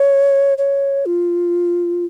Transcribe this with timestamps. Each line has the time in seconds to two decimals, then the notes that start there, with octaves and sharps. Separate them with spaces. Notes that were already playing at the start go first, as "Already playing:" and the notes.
Already playing: C#5
0.58 C#5
1.06 F4